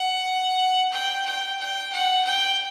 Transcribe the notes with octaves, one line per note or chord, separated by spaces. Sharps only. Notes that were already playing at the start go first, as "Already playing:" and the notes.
Already playing: F#5
G5
G5
G5
F#5
G5